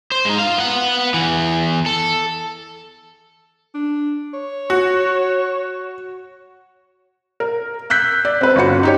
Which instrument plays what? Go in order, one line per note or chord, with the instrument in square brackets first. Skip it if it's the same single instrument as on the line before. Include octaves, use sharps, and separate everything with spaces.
[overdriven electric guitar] C5
G#3 D#4
F4 F5
B3 F#5
E2 E3
A4
[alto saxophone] D4
C#5
[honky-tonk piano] F#4
[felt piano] A#4
E6 F#6 G6 B6
D5
C4 B4
G1 C#4 F#4 C#7
D#4 G4 C#5